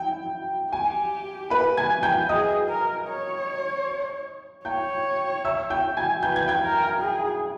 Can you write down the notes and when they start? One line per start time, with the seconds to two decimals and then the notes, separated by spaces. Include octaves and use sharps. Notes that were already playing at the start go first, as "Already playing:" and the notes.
Already playing: E4 G5
0.72 G4 G#5
1.50 B4 B5
1.77 G#5 G#6
2.03 G5 G6
2.29 G#4 D#5 D#6
2.69 A#4
3.09 C#5
4.65 C#5 G5 G6
5.45 E5 E6
5.70 G5 G6
5.97 G#5 G#6
6.23 B4 G6
6.36 G#6
6.48 G5 G6
6.62 A#4
7.01 G#4